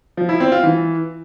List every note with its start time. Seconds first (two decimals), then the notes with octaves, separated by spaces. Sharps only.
0.17 F3
0.29 E4
0.40 C4
0.52 F4
0.63 E3